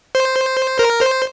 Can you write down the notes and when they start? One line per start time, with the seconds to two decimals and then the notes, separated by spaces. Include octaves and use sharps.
0.15 C5
0.79 A#4
1.01 C5